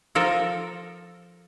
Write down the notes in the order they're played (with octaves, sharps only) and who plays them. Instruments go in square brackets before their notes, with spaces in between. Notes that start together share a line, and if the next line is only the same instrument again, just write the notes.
[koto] F3 A4 A#4